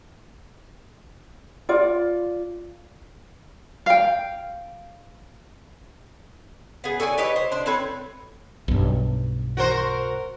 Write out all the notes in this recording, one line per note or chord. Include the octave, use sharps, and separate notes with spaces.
F4 D5
F5 G5
B3 G#4
A4 C#5 D5 G#5
G4 B4 C#5 D#5
C5
D4 C5
C4 A4 B4 C#5
B1 G2
F#4 A#4 C5